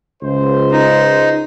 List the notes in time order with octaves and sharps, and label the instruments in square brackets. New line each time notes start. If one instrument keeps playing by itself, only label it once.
[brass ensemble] C#2 C5
[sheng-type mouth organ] D#4